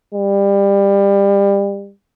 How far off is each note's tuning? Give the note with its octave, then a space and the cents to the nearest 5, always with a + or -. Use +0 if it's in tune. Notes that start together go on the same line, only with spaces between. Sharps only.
G3 +25